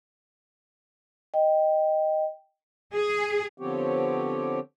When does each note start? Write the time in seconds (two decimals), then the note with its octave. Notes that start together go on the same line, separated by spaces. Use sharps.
1.34 D#5 G5
2.95 G#4
3.58 D3 F3 B3 C4 G4 C#5